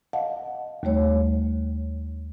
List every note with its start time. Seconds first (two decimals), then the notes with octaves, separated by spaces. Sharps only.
0.13 D#5 F5 F#5 A5
0.83 D#2 G3 A3 C#5